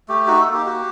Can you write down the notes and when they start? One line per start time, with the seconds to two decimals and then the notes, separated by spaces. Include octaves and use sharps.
0.08 A3 G4
0.27 D#4 F#4
0.41 A4
0.47 A#3
0.53 G4
0.66 F#4 G4